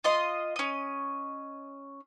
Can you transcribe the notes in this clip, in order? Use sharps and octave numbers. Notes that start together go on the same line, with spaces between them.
F4 D#5 C6
C#4 D#5